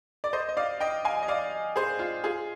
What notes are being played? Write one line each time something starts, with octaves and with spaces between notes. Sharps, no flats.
D5
C5 D#5
D#5
D5 F5
D#5 G5
F5 G#5
D#5
D5 F5
G#4 C5
F4
F4 G#4